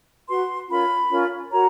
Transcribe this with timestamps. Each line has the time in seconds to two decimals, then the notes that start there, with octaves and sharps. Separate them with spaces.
0.28 F#4 B4 C6
0.69 C#4 F4 A#4 C#5 B5
1.09 C#4 F4 A#4 C#5
1.50 F#4 A#4 C#5 A#5